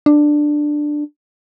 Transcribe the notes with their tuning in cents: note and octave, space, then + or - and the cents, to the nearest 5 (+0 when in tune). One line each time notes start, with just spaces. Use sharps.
D4 +10